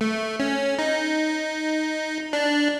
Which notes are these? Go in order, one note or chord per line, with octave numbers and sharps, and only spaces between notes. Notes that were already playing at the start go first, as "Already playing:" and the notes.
A3
C#4
D#4
D4